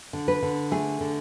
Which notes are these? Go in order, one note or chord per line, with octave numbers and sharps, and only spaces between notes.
D3
B4
D3
A3 G#4
D3